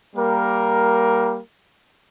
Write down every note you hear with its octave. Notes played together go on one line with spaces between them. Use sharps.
G3 A#3 A#4